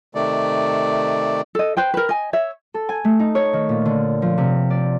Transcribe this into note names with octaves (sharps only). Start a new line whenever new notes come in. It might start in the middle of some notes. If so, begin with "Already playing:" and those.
C3 D#3 A3 D5
A4 D#5
B4 C5 G5
A#4 B4
D#5 G#5
C#5 E5
A4
G#5
A3
D#4
C#5
D#3
A#2
D3
F3
C3
D5